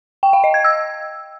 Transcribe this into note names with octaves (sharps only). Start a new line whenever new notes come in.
G5
F5
D#5
G#6
E6